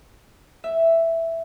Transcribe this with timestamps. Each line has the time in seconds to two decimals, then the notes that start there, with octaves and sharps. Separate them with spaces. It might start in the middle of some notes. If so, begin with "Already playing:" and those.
0.64 E5